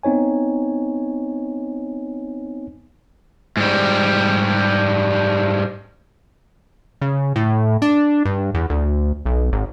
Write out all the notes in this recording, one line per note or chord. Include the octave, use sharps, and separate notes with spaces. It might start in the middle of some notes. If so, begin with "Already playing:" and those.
B3 C4 D#4 C#5 G#5
G#2 G3
C#3
A2
D4
G2
E2
D2
B1
G#1